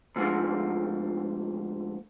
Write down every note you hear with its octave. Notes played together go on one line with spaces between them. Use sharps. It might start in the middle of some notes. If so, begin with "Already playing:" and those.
D2 G#2 D3 F3